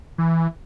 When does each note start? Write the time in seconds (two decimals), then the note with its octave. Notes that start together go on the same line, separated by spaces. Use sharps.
0.18 E3